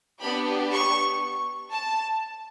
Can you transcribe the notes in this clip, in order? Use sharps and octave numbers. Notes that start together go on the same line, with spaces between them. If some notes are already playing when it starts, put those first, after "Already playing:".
B3 D4 G4 B5
C#6
A5